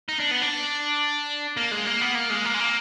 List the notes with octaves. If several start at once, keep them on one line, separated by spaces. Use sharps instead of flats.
D#4
D4
B3
D4
A#3
G#3
A#3
B3
A#3
G#3
A#3
G#3
A#3